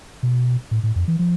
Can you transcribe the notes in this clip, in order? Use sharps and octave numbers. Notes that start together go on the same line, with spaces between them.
B2
A2
A2
F2
E3
F3